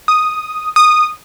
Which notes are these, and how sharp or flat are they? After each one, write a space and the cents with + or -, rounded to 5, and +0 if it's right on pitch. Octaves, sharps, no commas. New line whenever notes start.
D#6 +0
D#6 -15